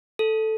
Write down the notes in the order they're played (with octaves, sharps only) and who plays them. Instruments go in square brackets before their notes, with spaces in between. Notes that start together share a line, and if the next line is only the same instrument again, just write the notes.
[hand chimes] A4